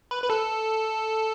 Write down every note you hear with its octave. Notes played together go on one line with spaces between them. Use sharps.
B4
B4
A4